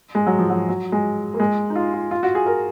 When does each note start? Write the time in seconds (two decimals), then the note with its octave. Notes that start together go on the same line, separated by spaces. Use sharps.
0.15 G#3
0.27 F#3
0.38 F3
0.50 F#3
0.69 F#3
0.92 G#3
1.34 A#3
1.40 G#3
1.70 D#4
1.75 F4
1.93 F4
2.11 F4
2.23 F#4
2.35 G#4
2.46 A#4